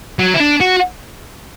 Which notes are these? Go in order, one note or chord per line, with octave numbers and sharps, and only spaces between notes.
F#3
E4
D4
F#4